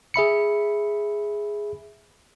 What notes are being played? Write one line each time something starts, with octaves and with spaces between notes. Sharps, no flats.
G#4 E5 B5 C#7